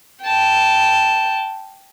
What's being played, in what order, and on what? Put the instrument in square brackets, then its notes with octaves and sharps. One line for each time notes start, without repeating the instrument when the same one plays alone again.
[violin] G5 A5